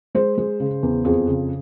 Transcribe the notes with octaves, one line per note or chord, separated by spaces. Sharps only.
G#3 C5
G#3
C#3
E2
F2 G#4
C#3